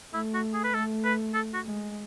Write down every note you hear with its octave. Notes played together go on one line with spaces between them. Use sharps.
A3 E4
F#4
G#4
B4
A3 A4
B4
A4
F#4
G#3